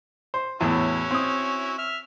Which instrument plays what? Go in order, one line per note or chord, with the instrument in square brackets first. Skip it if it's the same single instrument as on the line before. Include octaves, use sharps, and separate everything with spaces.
[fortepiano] C5
[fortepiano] E2 A2 [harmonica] C#4 E4 F#4
[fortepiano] C4 D#6
[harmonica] E5 F6